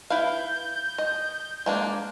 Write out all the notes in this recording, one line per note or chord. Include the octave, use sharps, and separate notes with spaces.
E4 B4 F5 G6
D#5
G#3 A#3 D4